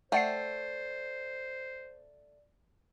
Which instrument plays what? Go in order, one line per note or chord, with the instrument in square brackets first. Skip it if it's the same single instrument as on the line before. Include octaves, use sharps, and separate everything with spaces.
[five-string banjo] A3 G5 [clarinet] C5 [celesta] D5 A6 [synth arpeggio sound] E5 F#5 C7